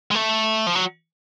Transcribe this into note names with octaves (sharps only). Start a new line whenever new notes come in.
G#3
A3
F3
F#3